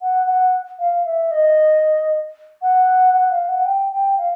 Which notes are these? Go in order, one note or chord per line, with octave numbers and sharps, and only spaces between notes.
F#5
F#5
F5
E5
D#5
F#5
F#5
F5
F#5
G5
G5
F5